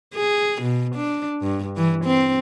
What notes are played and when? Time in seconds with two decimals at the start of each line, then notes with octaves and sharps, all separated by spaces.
0.15 G#4
0.62 B2
0.95 D4
1.42 G2
1.76 E3
2.05 C4